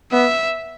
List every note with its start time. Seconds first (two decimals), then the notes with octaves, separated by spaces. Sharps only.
0.12 B3 E5